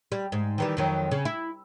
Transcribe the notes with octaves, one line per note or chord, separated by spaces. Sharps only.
G3
G#2
D#3 E3 G3
F2 D#3 F#3
C#3
E4